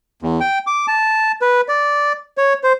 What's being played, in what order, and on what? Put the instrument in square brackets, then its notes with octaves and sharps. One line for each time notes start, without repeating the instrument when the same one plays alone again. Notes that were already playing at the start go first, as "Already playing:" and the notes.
[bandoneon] E2
G5
D6
A5
B4
D5
C#5
C5